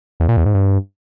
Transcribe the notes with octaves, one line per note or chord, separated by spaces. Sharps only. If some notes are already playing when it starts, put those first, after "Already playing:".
E2
A#2
E2
G#2
G2